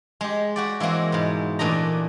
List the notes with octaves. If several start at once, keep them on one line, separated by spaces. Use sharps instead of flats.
G#3 G4
F#4 G4 D5
E3 G#3 A#3 C4 F#4
G#2 B2
A#2 E3 A3 D4 D#5 A#5